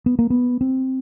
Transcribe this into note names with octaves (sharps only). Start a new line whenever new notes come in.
B3
A#3
B3
C4